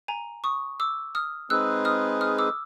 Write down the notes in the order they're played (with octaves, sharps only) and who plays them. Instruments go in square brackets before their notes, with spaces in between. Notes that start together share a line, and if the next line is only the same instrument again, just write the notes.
[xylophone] G#5 A#5
C#6 D#6
D6 E6
D#6 F6
[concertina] G#3 C4 D#4 G#4 B4 [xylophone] E6 F#6
[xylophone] D#6 F6
D#6 F6
D6 E6